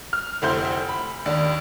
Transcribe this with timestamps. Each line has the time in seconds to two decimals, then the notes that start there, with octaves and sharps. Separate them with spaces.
0.13 F6
0.42 F1 D2 E4 C5 G6
0.88 B5
1.26 D#2 D4